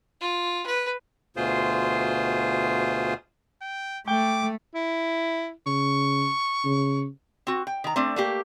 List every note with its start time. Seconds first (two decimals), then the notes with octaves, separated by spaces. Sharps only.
0.21 F4
0.66 B4
1.36 D2 B2 F4 G#4 C5
3.62 G5
4.08 A3 G5 D6
4.75 E4
5.66 C#3 C#6
6.65 C#3
7.47 C4 F#4
7.67 G5
7.84 D#3 A#5
7.96 A3 C4 D4
8.16 A3 A#3 G4